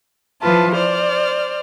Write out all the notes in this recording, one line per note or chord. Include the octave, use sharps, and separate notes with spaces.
E3 F3 F4 B4 A5
C5 D5 F6